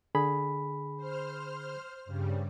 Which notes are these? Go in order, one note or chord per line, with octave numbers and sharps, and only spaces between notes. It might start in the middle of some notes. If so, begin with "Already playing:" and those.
D3 G#4 B5
C5 F6
G2 C#3 G3